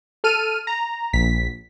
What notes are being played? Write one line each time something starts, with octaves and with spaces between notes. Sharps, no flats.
A4 F6 D#7
A#5
A#1 B6